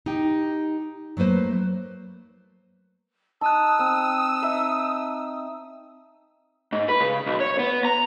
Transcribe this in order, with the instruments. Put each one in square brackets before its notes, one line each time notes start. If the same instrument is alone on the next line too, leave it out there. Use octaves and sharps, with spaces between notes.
[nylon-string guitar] D#4 G4 G5
F#3 A3 A#3 B4 C5
[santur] D#4 [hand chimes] A5 F#6 [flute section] D#6 E6
[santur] C4
D#4 E5
[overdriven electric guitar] G#2
B4
C#3
B1
C#5
B3
A#5